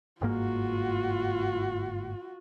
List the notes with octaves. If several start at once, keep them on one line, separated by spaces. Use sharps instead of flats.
G1 G#2 A#3 F4 F#4